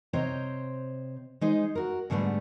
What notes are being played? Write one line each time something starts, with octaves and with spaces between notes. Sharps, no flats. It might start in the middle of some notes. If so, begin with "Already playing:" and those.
C3 C5 C#5 D#5 G5 A#5
G#3 D#4 C5
F#4 A#4
G#2 D3 G3 A3 B3